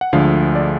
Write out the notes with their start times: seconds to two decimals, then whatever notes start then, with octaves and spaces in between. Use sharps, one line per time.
0.01 F#5
0.13 D2 D3 F3 G#3 F5
0.55 D5